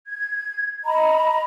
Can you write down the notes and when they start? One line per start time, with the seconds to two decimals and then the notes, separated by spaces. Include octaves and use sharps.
0.07 G#6
0.84 D#5 A#5 B5